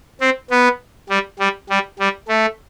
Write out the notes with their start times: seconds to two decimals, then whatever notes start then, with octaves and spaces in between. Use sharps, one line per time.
0.21 C4
0.51 B3
1.09 G3
1.39 G3
1.70 G3
1.99 G3
2.28 A3